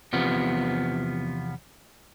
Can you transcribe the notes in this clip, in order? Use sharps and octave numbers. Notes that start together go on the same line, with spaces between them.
E2 C3 F3 B3